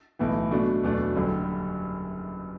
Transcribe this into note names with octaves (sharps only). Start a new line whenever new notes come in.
B1 A2 E3
B2 F#3 A3 D4
E2 B2 F#3 A3 D4
F#1 F#2 D3 G3